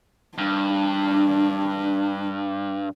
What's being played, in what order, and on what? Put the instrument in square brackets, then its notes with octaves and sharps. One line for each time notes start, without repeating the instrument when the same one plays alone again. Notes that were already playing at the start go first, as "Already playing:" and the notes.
[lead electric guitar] G2 [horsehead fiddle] D4